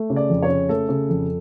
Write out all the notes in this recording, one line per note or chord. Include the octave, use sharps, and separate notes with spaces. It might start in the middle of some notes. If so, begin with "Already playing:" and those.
Already playing: A3
C#3
D5
F2
C#5
C#3
A3 A4
C#3
F2